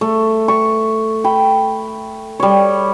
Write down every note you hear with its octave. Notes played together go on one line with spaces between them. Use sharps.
A3
C#6
G5 B5
G3 C#5